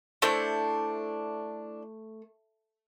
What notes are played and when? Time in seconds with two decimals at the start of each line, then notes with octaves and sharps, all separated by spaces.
0.22 A3 D4 E4 C5